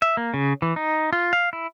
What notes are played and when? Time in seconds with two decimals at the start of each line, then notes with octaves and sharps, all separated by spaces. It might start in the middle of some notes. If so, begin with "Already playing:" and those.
0.02 E5
0.17 A#3
0.34 C#3
0.62 E3
0.76 D#4
1.13 F4
1.33 F5
1.53 E4